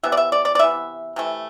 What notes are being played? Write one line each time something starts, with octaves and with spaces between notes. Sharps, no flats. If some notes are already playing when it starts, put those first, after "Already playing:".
C3 E3 B3 E5
D5
E5
D5
D5
D5
C3 E3 B3 E5
C3 E3 A3